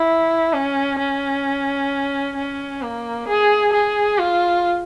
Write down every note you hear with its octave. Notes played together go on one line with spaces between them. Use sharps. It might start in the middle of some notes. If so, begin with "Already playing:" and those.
Already playing: E4
C#4
C#4
C#4
A#3
G#4
G#4
F4